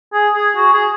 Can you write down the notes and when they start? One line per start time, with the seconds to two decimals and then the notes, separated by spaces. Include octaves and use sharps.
0.13 G#4
0.35 G#4
0.56 F#4
0.73 G#4